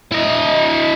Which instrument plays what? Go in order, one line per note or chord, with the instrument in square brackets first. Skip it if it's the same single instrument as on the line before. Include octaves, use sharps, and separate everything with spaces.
[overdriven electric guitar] E4 D#5